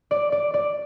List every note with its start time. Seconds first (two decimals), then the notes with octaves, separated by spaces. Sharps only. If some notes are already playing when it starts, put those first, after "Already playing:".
0.11 D5
0.32 D5
0.54 D5